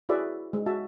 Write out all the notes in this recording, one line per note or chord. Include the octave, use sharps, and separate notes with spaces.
E4 F#4 G#4 B4 D5 E5
G#3
F#4 E5 A5